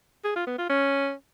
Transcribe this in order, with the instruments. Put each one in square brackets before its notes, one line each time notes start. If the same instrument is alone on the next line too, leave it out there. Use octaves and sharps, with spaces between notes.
[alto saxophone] G#4
F4
B3
F4
C#4